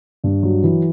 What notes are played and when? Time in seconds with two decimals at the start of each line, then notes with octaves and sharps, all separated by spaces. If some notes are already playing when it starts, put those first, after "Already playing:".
0.24 G2
0.43 F#3
0.63 E3